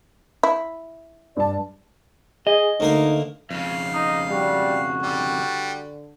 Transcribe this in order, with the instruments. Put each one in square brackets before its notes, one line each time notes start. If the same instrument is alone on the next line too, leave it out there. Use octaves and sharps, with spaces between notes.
[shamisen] E4
[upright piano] G2 A5 [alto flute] D5
[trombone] G#4 [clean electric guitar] D#5
[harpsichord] D2 A#3 A#4 [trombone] D#4
[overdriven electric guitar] F2 C#3 [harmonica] F5
[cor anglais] D#4
[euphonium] G3 [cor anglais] F#4
[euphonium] D3 [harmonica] G3